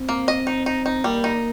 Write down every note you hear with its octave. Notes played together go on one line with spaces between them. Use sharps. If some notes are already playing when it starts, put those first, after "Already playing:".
Already playing: C4
A#3
D#5
D#4
D#4
D#4
G3 A#3
D#4